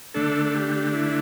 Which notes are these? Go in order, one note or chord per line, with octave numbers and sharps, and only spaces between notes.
D3 A3 D4 A4
A4
G4
E4